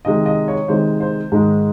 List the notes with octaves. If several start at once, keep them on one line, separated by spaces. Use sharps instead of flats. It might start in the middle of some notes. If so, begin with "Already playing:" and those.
C3 D#3 G#3 D#5
D#5
C#5
C3 D#3 G#3 C5
C5
G#2 D#3 G#3